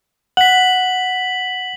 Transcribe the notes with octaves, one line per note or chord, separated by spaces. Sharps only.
F#5 B6 F#7